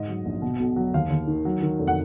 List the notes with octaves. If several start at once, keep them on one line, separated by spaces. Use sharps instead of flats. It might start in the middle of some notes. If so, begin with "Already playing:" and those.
Already playing: G#2 D#5
F#3
A#1
B2
B1
F#3
D#2 F5
D#2
D#3
F#3
D#3
F1
F#5